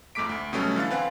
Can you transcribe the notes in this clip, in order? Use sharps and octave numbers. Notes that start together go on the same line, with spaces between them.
F2 G#2 A3 D6 B6 D7
D2
B2 F#3 G3 A3 C#4
D3 E3 F5 A6
C4 B4 F5 F#5 G#5